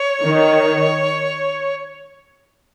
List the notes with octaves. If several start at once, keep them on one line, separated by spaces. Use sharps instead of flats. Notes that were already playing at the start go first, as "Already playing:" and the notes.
Already playing: C#5
D#3